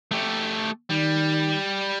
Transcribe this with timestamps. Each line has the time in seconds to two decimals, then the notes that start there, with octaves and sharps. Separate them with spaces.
0.11 A3 G4
0.90 D#3 G3